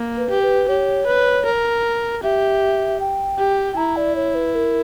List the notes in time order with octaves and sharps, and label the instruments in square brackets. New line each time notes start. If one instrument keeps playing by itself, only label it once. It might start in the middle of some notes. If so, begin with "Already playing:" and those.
Already playing: [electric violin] A#3
[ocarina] B4
[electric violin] G4
[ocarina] B4
[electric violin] G4 [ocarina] C#5
[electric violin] B4
A#4
[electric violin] G4 [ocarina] E5
[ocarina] G5
[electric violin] G4
[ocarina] G5
[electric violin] E4 [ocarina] A#5
[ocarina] D5
C#5
B4
A#4